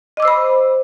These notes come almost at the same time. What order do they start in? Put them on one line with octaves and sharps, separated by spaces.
D#5 D6 E6 C5 B5